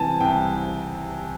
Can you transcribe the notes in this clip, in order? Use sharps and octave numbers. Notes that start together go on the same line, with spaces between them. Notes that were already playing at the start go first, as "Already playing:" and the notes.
Already playing: C3 E3 G#5 A5
C2 G5